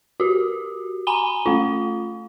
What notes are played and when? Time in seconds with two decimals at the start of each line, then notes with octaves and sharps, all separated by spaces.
0.20 F#4 G4
1.07 G#5 A#5 B5 D#7 G7
1.46 A3 F4